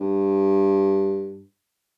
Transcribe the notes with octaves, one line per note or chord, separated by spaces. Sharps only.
G2